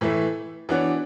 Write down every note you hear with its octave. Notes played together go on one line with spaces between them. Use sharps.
A2 E3 A3 E4
E3 B3 D4 F#4 C#5